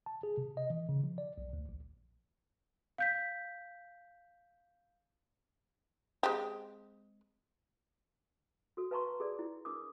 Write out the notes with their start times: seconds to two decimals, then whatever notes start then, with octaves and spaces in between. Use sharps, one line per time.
0.06 A5
0.23 G#4
0.37 C3
0.57 D#5
0.70 E3
0.89 C#3
1.04 F3
1.18 D5
1.38 B1
1.53 D2
1.69 A#1
2.98 F5 G6 B6
6.23 G#3 C4 G4
8.77 F#4 A4
8.91 B4 F5 A5 A#5 C6 C#6
9.20 G#4 A4 D5
9.39 E4
9.65 D4 A#4 D6 D#6